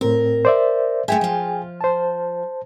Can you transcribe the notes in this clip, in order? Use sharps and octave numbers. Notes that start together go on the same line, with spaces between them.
A2 C4 A#4
C5 D5 E5
A3 F4 G#4 E5 G5 G#5
F3 F4
C5 A5